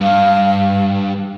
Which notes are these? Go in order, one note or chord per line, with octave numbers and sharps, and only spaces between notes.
G2 F5